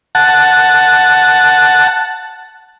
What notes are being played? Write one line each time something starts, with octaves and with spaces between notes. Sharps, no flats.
F#5 A5